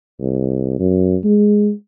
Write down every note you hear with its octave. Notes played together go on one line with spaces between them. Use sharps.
C2
F#2
G#3